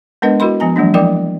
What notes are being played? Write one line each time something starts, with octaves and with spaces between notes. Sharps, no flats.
G#3 B3 D4 A#4 B4 D#5
E4 F#4 A#4 D#5 B5 C6
F3 B3 G#5 A#5
E3 F#3 G#3 A#3 D4
F3 E4 A#4 D5 G5 D6